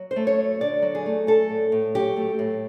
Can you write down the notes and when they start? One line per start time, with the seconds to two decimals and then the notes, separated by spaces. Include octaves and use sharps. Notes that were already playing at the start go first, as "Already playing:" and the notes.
Already playing: F#3
0.11 C5
0.16 A3
0.27 C#5
0.39 F#2
0.61 D3 D5
0.82 F#3
0.95 G#4
1.06 A3
1.27 A3 A4
1.50 A2
1.72 A2
1.95 F#3 G4
2.16 A3
2.39 A2